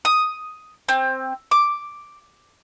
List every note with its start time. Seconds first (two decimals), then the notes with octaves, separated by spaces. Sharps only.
0.05 D#6
0.88 C4
1.51 D6